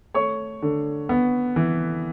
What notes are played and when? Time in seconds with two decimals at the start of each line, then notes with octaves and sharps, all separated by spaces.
0.14 A3 C#5 C#6
0.62 D3
1.09 B3
1.56 E3